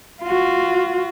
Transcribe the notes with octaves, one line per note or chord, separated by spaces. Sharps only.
F4 F#4